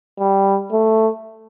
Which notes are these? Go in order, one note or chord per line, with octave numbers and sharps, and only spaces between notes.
G3
A3